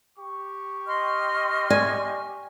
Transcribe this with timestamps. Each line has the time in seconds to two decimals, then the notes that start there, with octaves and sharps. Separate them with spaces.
0.18 G4 C#6
0.87 D#5 C6 F6
1.70 D5 G#5